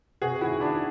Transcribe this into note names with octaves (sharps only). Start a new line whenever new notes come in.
C3 F#4 G#4
D#3 E4 F#4
D#3 D4 E4